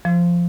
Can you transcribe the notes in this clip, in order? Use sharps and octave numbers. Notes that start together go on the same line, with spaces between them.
F3